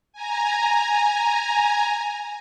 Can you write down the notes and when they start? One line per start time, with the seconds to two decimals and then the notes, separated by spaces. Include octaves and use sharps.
0.13 G#5 A#5